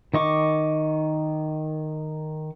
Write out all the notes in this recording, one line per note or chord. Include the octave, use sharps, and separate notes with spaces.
D#3 D#5 C#6 D6